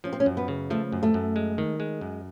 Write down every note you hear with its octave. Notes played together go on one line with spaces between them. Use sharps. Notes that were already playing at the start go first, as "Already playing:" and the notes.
F3 C#4
C4
C#4
F#2
B3
C#3
F3 A3
F#2
A3
F#2
G#3
D#3
G#3
F#2